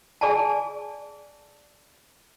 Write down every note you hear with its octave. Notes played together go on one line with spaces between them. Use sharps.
G#4 D5 G#5 A5